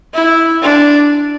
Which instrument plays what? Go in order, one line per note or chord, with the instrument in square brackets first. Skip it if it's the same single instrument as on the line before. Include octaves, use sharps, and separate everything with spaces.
[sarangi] E4
D4